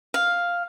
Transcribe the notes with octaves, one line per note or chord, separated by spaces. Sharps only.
F5